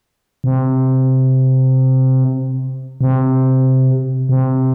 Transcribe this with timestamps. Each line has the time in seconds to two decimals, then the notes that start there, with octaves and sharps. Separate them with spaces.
0.44 C3
3.01 C3
4.29 C3